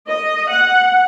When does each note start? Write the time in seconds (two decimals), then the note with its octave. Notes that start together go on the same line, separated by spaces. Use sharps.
0.09 D#5
0.52 F#5